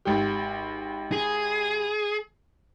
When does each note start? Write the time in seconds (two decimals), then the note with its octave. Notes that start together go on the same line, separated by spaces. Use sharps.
0.05 G#1 G4
1.12 G#4